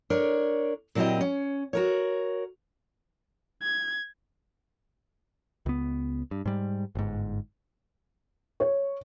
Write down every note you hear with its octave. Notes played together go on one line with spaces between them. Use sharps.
D4 A#4 C#5
A#2 F#3 C4 E4 G4 D#5
C#4
F#4 A#4 C#5
G#6
C#2 B3
G2
G#2 G3
G1 G#2
C#5